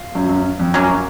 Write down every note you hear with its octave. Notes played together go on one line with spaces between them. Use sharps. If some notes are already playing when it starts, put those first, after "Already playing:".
Already playing: F4
F#2
F#2
F2
F#2 F#3 A#3 C#4